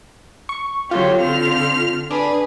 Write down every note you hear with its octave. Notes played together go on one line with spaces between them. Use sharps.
C#6
D3 F#3 F4 G4
D3 C4 F6
D4 G#4 B4